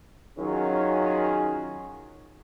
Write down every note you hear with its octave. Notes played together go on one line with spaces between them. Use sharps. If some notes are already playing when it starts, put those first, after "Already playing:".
D#3 F#3 C#4 F4 G#4